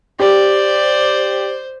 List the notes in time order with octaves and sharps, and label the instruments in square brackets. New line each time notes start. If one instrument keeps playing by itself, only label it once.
[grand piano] G4 [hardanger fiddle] C5 [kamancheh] D5